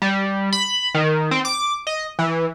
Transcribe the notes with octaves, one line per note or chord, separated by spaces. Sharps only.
G3
B5
D#3
C4
D6
D#5
E3